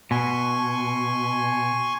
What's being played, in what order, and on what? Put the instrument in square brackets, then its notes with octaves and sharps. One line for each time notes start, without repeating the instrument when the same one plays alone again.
[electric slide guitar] B2 [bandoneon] G#5 C6 C#6